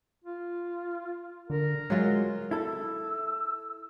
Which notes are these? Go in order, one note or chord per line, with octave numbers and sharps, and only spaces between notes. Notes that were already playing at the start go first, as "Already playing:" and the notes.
F4
D3 A#4
F#3 G#3 F4
E4 A4 E6